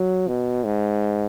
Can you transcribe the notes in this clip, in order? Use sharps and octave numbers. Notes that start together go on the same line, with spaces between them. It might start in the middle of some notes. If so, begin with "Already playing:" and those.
Already playing: F#3
B2
G#2